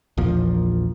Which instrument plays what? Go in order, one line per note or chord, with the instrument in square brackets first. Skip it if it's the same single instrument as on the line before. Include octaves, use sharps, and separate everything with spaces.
[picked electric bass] A#1 E2 A#2 F3